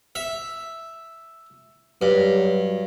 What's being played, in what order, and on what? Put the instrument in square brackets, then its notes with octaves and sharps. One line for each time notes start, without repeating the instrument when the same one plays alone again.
[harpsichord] E5
[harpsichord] G2 [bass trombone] F#3